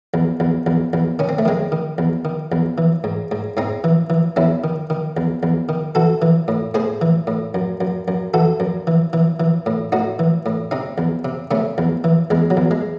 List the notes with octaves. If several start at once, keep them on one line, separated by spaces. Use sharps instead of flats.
E2
E2
E2
E2
D#3 C#4
C4
A3
D#3 G#3 C4
D#3
E2
D#3
E2
E3
G#2
G#2
G#2 C4 D#4
E3
E3
E2 C#4 E4
D#3
D#3
E2
E2
D#3
E3 F#4 A4
E3
A2
A2 G#4 C5
E3
A2
F#2
F#2
F#2
E3 F#4 A4
F#2
E3
E3
E3
A2
A2 D#4 F#4
E3
A2
C3 C4 D#4
E2
C3
C3 A3 C#4
E2
E3
E2 G#3
F#3
E2
G#3